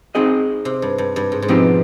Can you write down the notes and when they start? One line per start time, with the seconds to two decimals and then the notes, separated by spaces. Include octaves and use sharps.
0.15 C4 D#4 G#4 C5 D#5
0.65 C3
0.82 G2
0.98 G2
1.16 G2
1.32 G#2
1.42 G#2
1.48 B2 F3 C4 D#4 G4